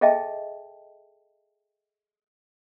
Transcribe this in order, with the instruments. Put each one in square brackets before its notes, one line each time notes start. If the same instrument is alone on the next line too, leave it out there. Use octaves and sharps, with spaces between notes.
[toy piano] G#4 A4 D#5 E5 G5 A5